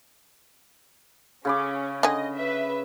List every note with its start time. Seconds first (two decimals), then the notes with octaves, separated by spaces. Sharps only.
1.45 C#3 C#4 B5 D6
2.03 D3 G#4 D#5
2.35 B4 E5